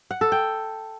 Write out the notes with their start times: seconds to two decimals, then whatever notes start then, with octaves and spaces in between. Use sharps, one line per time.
0.11 F#5
0.21 A4
0.32 G5